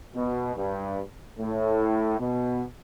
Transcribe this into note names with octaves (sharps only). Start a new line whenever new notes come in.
B2
G2
A2
B2